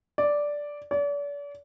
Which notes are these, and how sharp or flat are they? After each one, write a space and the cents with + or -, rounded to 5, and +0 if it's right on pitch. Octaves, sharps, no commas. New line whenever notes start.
D5 -5
D5 -40